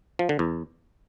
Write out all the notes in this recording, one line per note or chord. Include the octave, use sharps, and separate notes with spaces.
F3
D3
E2